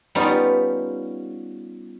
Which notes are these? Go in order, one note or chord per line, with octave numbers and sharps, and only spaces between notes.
G3 B3 C#4 D#4 F4